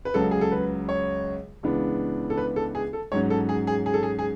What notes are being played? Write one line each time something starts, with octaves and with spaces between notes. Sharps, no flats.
B4
C#2 C#3 F#3 A4
G#4
A4
B4
C#5
C#2 C#3 E3 B3 D4
A4
B4
A4
G#4
A4
G#2 F#3 C#4 C#5
A4
G#4
G#4
G#4
A4
G#4
G#4